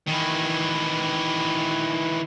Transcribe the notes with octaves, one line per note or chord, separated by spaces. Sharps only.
D#3 E3